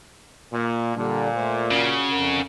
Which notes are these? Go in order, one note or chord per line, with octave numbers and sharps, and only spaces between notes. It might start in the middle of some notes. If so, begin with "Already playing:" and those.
A#2
A#2 D3 G3 D4
A3 C5
C#3 F#4
F2 A#4 F#5